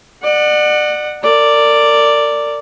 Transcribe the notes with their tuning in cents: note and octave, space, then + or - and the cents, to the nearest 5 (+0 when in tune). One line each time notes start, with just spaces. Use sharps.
D5 +35 F#5 -5
A#4 -35 D5 +0